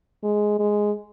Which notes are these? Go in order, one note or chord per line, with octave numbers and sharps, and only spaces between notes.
G#3
G#3